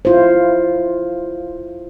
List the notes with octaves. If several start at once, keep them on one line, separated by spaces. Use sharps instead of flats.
E4 F4 C5